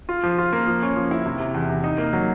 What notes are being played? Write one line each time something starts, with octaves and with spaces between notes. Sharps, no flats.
F4
F3
F4
A#3
F3
C#4
F3
E4
C3
C3
E2
C3
D#4
A#3
F#3